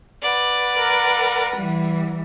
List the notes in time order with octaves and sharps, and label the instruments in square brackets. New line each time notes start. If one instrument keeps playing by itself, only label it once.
[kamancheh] B4 F#5 [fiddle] D5
[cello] A#4
E3 G3